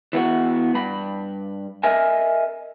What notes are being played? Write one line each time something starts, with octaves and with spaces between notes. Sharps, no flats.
E3 B3 F#4
G2 B5
A#4 D#5 E5 G#5